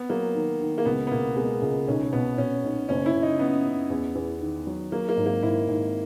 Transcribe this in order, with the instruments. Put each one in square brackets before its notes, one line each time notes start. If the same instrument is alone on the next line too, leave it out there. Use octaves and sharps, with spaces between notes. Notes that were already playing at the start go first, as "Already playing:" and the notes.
Already playing: [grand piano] B3
[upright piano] F#3 [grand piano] A#3
[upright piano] D#3
D#3
[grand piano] A#3
[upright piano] C#2 [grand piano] B3
[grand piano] B3
[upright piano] B2 [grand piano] A#3
[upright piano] G#3 [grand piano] B3
[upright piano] C#2
[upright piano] B1 [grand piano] C#4
[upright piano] B2 [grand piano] B3
[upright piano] B2 [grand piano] C#4
[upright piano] B1
[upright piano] F#1 [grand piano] C#4
[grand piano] E4
[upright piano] F#1
[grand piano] D#4
[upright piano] F#2 [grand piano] B3
[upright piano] F#2
E2
E2
D#3
F#3
[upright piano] F#3 [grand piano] A#3
[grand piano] A#3
[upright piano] G#1
[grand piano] A#3
[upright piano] G#1 [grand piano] E4
[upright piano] G#1